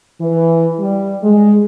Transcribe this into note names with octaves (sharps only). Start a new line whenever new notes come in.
E3
G3
G#3